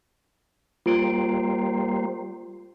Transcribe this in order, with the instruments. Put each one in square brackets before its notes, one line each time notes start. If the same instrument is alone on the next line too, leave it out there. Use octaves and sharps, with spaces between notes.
[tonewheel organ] G3 A#3 C5 [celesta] F4 D7